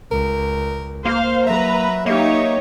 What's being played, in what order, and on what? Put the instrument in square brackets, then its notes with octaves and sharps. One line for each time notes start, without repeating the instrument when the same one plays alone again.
[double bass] C#2 [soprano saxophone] A#4
[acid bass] A#3 [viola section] C5 F5
[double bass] F#3 [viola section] B4 A#5 [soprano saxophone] E5
[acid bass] A#3 [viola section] D#4 G4 C#5 [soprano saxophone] E5